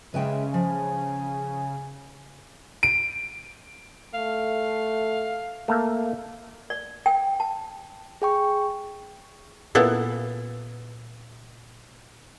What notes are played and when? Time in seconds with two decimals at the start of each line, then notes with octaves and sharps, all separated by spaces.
0.14 C#3 G#3 B4 E5 G5
0.54 F3 G#5
2.83 D7
4.14 A3 F5
5.68 A3 A#3
6.70 D5
7.06 G5
7.40 A5
8.22 G#4 G5 C#6
9.75 A#2 B3 E4 A4